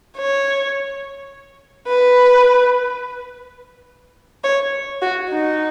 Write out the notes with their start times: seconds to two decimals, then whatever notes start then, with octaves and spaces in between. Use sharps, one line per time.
0.18 C#5
1.88 B4
4.44 C#5
5.02 F#4
5.30 D#4